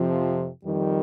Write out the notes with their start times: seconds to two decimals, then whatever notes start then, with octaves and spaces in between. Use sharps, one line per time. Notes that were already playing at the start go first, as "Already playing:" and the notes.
Already playing: F2 C3 F3
0.65 F2 D#3 G3